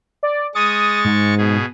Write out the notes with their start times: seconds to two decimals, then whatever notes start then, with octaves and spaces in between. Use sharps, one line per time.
0.23 D5
0.55 G#3 C#6 D#6 A6
1.05 G#2
1.38 B2 G#4